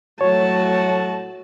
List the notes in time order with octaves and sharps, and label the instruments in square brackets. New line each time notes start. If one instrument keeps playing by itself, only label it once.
[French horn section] A2 F#4 [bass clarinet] F#3 [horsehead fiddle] A3 A5 [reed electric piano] C#5